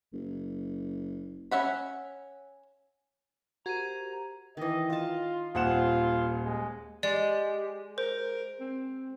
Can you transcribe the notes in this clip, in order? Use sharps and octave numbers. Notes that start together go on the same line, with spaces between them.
F#1
C#4 E5 F#5 B5
F#4 G4 A#4 C5 A#5 G#6 D#7
D#3 E3 D#5
F4 D#5 A5
D#1 C4 F4 F#5 E7
G#3
G#3 G4 D5
A#4 C5
C4